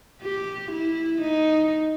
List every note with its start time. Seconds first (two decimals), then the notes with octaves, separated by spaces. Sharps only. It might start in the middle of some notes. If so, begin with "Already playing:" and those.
0.22 G4
0.72 E4
1.22 D#4